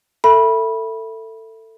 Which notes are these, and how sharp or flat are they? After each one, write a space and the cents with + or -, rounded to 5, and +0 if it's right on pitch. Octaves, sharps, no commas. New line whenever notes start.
A4 +25 E5 +10 B5 -20